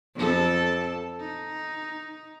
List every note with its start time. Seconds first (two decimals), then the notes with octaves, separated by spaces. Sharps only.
0.16 F2 A4
1.20 D#4